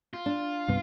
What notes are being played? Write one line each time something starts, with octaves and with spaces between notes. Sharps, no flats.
F4
D4
C2 G2 B3